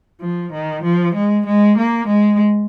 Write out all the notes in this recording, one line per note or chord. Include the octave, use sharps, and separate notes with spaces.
F3
D#3
F3
G#3
G#3
A#3
G#3